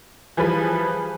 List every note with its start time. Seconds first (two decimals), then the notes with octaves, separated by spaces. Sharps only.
0.37 E3 F3 G3 G#4 B4